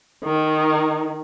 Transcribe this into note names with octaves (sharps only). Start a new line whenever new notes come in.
D#3